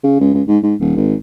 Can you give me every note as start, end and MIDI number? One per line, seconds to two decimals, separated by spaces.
0.03 0.15 49
0.20 0.31 37
0.34 0.42 37
0.47 0.58 44
0.63 0.74 44
0.80 0.91 27
0.96 1.14 32